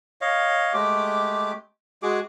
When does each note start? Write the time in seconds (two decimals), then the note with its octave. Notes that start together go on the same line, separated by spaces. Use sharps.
0.21 C#5 D#5 F5
0.74 G#3 A3 G4 D6
2.03 G#3 F#4 G#4 D6